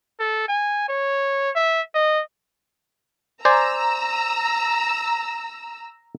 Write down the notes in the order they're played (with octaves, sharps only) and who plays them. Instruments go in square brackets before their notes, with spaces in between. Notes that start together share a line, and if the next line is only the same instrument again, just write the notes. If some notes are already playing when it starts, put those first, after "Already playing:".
[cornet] A4
G#5
C#5
E5
D#5
[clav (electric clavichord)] C5 D5 G#5 [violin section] A#5 E6